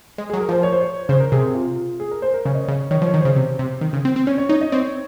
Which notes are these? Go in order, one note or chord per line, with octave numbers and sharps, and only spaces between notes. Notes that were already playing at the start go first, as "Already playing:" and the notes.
G#3
F#3 G#4
A#4
F3 C5
C#5
C5
C#5
C#3 C5
A#4
C3 G#4
F4
G#4
A#4
C5
A#4
C#3 C#5
D#5
C#3 C#5
D#3 C#5
F3
C#5
D#3
C#3 C5
C3
C3
D#3
C#3
C4
C4
C#4 C#5
C#5
D#4 C#5
D#5
C4 C#5